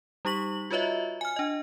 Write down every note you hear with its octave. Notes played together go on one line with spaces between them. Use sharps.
G3 D#4 G4 C#6 B6 F#7
F4 F#4 B4 C#5 D#5 E5
G#5 F6
D4 D#5